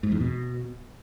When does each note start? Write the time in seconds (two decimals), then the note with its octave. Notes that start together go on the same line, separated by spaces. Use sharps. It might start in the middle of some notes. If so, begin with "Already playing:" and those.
0.03 G#2
0.12 E2
0.20 B2